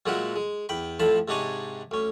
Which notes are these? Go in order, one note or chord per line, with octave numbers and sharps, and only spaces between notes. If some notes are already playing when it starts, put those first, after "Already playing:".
A#2 F#3 G#3 A#4 E5 F#5
G#3
E2 G5 B5
F2 A2 F3 A5 B5
G#2 C3 D4 D#4 C#5 G#5
D2 C#4